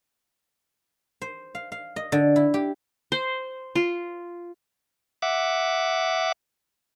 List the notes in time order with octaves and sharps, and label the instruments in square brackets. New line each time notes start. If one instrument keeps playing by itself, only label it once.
[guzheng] C5
F5
F5
D#5
D3
E4
G4
[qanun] C5
F4
[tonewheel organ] E5 F#5 D6